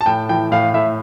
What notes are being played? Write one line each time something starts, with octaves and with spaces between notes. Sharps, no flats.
A5
A2 G5
E3 G5
A2 F5
A2 E5